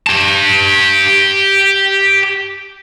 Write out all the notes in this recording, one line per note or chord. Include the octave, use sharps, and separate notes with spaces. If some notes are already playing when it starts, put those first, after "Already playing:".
G4 A5